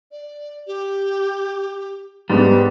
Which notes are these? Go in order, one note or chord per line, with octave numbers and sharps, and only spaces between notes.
D5
G4
G#2 G3 B3 B4